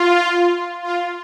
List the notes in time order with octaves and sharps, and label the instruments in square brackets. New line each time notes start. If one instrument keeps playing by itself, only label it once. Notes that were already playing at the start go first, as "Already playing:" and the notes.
Already playing: [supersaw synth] F4
F4